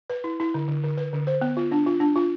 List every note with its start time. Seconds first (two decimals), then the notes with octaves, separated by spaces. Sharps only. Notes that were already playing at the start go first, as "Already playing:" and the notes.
0.10 B4
0.24 E4
0.40 E4
0.54 D3
0.68 D3
0.84 D3
0.97 B4
1.13 D3
1.27 C5
1.41 B3
1.57 F4
1.72 D4
1.86 F4
2.00 D4
2.16 F4